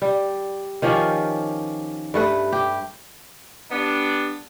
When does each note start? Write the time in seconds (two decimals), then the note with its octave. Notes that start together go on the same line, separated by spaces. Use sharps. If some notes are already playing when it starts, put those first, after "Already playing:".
0.02 G3
0.82 D#3 F3 C#4 G4
2.14 G2 A3 B4
2.52 G4
3.71 G3 B3 D4